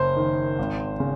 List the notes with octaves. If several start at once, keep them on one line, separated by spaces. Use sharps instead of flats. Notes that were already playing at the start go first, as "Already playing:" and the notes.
Already playing: F#1 C5
D#3
G#1
C#3